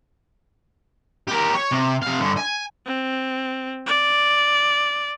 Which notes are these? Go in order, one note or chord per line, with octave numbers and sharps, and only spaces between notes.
G4 A#4
C#5
C3
C3 F5
G2 D3
G#5
C4
D5